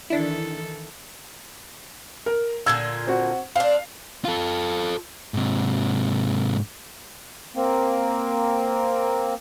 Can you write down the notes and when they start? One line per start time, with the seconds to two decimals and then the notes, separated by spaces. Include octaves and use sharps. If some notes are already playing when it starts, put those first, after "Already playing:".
0.10 D#3 E3 D4 E4 A4
2.26 A#4
2.66 A#2 D3 F4 E6 G#6
3.07 C4 F#4
3.56 C4 D4 F5
4.25 F4 A4
5.34 G#2 C3
7.56 A#3 C4